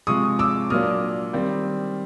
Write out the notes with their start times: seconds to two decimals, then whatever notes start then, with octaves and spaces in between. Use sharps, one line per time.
0.07 C3 F3 G#3 C#6 D#6
0.39 D6 E6
0.70 A#2 F#3 A#3 D4 D#6 F6
1.33 D#3 G3 C4